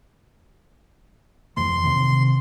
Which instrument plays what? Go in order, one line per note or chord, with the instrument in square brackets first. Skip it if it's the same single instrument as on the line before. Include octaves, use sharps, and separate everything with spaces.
[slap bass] F2 E3 A3 [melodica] C6
[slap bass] C3 D#3